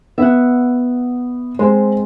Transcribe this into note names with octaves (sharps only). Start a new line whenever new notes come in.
B3 E5 F#5
G#3 C4 C5